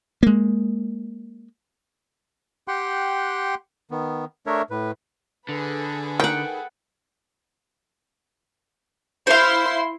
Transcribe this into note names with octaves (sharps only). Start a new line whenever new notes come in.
G#3 A#3
G4 F#5 G5 C6 F#6
D#3 B3
A3 D4 A#4 C#5 E5
A2 B4
D3 G#4 A4 B4
D#3 F#5 G5
E4 C5 F5 C6